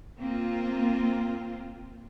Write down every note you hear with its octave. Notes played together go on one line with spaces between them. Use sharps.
A#3 C4 F4